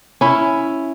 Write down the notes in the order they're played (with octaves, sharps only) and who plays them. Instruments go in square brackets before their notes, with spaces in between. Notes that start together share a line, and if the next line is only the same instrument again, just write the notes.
[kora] C#4 E4